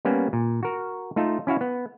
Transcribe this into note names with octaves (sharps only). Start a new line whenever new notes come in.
G3 A#3 B3 C#4
A#2
F#4 A#4
A3 D#4 F4 A4
C#4 E4 F#4 F5
B3